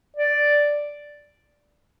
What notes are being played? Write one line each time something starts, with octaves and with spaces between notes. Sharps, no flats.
D5